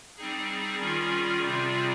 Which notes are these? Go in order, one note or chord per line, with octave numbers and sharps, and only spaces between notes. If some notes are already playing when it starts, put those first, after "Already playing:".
G3 C4 D#4 G#4
D#3 G3 C#4 F4 G#4
C3 G3 C4 F4 G#4